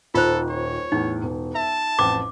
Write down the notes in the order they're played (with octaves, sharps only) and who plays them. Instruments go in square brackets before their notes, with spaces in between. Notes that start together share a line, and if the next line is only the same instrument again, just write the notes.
[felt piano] D#1 D#4 [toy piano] F4 C5 [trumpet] A4
[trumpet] C#5
[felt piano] E2 A2 [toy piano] D#4
[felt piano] E1
[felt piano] E5 [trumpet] A5
[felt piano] A1 F2 [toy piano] D6